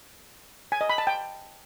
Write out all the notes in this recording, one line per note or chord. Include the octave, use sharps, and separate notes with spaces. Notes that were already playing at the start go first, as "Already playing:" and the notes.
G#5
D#5
B5
A5
G5